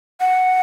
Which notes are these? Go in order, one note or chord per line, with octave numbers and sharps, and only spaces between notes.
F#5